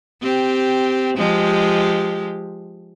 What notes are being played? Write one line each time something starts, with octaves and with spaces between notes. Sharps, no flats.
C4 G4
F3 G#3 G4